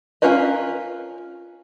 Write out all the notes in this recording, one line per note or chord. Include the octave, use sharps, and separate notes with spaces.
C#4 F4 A#4 B4 D#5